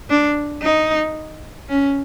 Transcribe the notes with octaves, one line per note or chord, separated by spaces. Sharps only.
D4
D#4
C#4